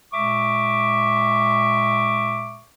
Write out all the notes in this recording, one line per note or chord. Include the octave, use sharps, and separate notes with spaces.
A#2 G#3 E5 C#6 D6